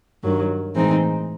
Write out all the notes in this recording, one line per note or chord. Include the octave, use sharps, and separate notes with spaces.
G2 D#3 F#3
A2 E3 G#3 C4 D#4